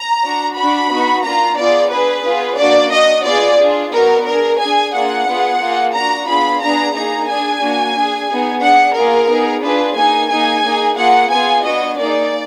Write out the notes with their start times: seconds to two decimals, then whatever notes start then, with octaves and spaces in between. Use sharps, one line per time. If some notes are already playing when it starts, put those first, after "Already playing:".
Already playing: A#5
0.24 D4 F#4
0.57 D4 F#4 B5
0.90 B3 D#4 F#4
1.24 A#3 D4 F4 A#5
1.57 B3 F4 G#4 D5
1.91 D4 G#4 B4
2.25 B3 F4 G#4
2.58 A#3 D4 F#4 D5
2.92 D4 F#4 D#5
3.25 B3 F4 G#4 D5
3.60 D4 F4 G#4
3.92 B3 D#4 F#4 A#4
4.26 D4 G#4 A#4
4.59 D4 G#4 G#5
4.94 A#3 D4 F4 G#4 F#5
5.27 B3 F4 G#4
5.61 A#3 F4 G#4
5.94 D4 F#4 A#5
6.27 B3 D4 F4 G#4 B5
6.62 B3 D4 G#4 A#5
6.94 A#3 D#4 G#4 A#5
7.28 D4 G#4 G#5
7.62 A#3 D4 F#4
7.95 D4 G#4
8.29 B3 D#4 G#4
8.62 D4 G#4 F#5
8.96 A#3 F4 G#4 A#4
9.29 B3 D#4 G#4
9.63 D4 F4 G#4 B4
9.96 A#3 D#4 G#4 G#5
10.30 A#3 D#4 G#4 G#5
10.64 A#3 D#4 G#4
10.97 A#3 F4 G#4 F#5
11.31 B3 F4 G#4 G#5
11.64 B3 D4 F#4 D#5
11.97 A#3 D#4 G#4 D5